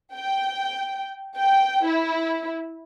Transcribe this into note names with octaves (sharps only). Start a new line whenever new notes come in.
G5
G5
E4